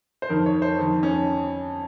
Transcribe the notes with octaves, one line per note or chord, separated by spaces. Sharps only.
C5
F2 D#3 A#4
C#5
C5
F2 D#3
C#4